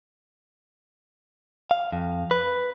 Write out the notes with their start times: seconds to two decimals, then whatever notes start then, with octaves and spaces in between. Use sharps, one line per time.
1.71 F5
1.92 F2
2.31 B4